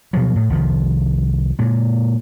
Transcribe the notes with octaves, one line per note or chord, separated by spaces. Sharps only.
B2 F3 F#3
A2
C2 D#3 F3
A#2 G#3